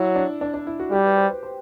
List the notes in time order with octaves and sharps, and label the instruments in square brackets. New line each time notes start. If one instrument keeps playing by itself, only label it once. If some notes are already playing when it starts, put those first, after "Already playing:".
Already playing: [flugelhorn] F#3 [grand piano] E4
[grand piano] D4
D4
D4
E4
F#4
[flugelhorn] G3 [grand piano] G4
[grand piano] B4
C5
B4
C5